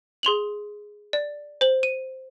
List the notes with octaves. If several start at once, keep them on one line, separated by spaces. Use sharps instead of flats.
G#4 C6 F7 F#7
D5
C5 F#7
D#7